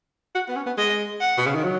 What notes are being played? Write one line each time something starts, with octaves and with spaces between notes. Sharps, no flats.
F#4
B3
C#4
B3
G#3 D#5
F#5
B2
C#3
D#3
F#3